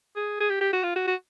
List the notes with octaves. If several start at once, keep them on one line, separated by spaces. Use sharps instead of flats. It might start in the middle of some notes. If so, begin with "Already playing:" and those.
G#4
G#4
G4
G4
F#4
F4
F#4
F#4